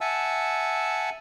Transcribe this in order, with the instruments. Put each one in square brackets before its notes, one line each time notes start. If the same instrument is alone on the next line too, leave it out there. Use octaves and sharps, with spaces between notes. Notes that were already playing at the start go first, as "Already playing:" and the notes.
[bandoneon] E5 F#5 G#5 A5 E6